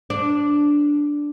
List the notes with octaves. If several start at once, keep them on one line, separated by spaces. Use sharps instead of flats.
D4